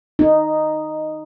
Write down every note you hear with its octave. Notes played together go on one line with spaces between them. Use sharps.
D#4